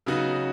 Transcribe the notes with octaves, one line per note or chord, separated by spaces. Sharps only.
C#3 F#3 B3 D#4 F#4